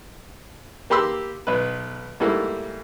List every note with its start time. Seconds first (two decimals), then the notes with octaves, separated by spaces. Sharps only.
0.90 A#3 G4 B5 C6 E6
1.47 B1 B2 B4
2.20 G#2 G3 A3 A#3 E4